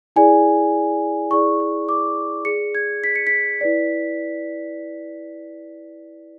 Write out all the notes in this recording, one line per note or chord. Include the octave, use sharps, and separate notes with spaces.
E4 G#4 D5 G#5
E4 G#4 D5 C#6
C#6
D6
G#4 D5 C#7
G#6
B6
C#7
B6
E4 B4 D5